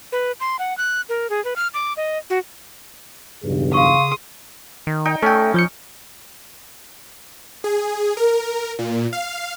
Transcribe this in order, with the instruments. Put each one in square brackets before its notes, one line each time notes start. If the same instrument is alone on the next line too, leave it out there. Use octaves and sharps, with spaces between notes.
[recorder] B4
C6
F#5
F#6
A#4
G#4
B4
F6
D6
D#5
F#4
[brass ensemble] B1 E2 G2 [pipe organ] C#3
[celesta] F5 C#6 [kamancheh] C6 D#6
[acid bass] D#3
[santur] D#4 G5
[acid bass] A3 [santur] C#4 [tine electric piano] A4 G5
[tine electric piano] F3 G6 C#7
[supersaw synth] G#4
A#4
A#2
F5